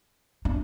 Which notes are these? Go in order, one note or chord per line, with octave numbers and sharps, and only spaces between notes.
D4